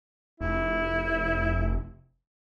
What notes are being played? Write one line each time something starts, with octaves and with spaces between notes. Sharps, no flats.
F1 E4